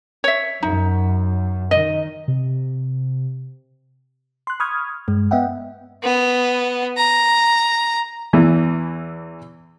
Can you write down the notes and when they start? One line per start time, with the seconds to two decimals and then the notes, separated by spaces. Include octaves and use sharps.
0.24 C#5 E5
0.63 F#2 D#4
1.71 D#3 D#5
2.28 C3
4.47 C6 F#6
4.60 B5 C#6 D#6 F6 G#6
5.08 G2 G#3
5.31 B3 D#5 E5 F#5 G5
6.03 B3
6.97 A#5
8.33 E2 E3